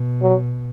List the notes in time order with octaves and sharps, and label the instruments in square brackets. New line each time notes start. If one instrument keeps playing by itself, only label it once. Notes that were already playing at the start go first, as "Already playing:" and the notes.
Already playing: [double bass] B2
[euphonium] F#3